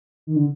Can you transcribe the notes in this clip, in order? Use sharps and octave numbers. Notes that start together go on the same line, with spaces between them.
D#3
D3